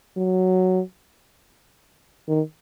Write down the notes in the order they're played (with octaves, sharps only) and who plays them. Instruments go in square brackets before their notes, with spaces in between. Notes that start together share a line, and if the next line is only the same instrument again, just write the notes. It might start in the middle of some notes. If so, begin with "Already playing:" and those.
[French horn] F#3
D#3